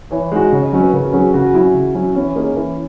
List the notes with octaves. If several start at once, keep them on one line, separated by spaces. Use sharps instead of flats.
E3 C#5
G#3 D#4 F#4
C#3 C#5
D#5
F#3 C#4 C#5
B4
C#3 A#4
F#4
F#3 C#4 G#4
C#3 F#4
F#3 C#4 E4
C#3
F#3 C#4
E3 C#4
A#3 D#4 G#4 C#5
E3